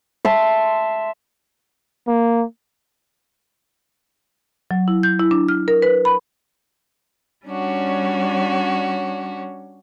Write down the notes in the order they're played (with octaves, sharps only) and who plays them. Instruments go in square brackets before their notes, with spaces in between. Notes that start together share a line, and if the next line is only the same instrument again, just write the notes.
[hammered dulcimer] E5 A5 C6
[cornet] A#3
[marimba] F#3
E4
G6
E4
D4
F6
A#4
B4
B5
[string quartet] G3 C#4 D4 F#4 C#5